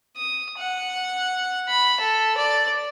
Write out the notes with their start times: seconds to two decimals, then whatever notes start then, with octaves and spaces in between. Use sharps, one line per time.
0.16 D#6
0.58 F#5
1.69 B5
2.01 A4
2.37 D5